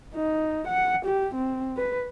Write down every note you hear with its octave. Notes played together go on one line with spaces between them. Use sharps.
D#4
F#5
G4
C4
B4